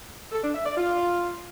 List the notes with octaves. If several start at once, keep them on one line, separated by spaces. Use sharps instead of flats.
A4
D4
E5
D5
F4